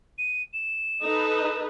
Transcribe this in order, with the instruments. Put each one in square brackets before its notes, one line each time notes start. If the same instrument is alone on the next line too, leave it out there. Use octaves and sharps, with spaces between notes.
[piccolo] D#7
E7
[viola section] D#4 A4 B4